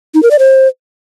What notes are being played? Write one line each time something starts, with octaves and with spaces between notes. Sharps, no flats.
D#4
A#4
D5
C5